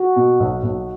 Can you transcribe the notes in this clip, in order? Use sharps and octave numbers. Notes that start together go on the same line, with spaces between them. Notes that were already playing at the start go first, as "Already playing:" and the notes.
Already playing: F#4
B2
B1
B1